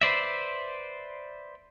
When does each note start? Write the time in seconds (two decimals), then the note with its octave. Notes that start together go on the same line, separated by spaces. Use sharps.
0.01 B4 C5 D5 E5